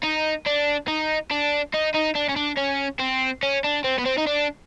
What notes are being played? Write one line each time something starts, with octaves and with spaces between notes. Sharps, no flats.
D#4
D4
D#4
D4
D#4
D#4
D4
C#4
D4
C#4
C4
C#4
D4
C4
B3
C4
D#4
D4